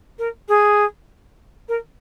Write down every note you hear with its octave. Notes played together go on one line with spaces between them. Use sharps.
A#4
G#4
A#4